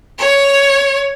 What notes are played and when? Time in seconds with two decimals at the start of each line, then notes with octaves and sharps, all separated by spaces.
0.19 C#5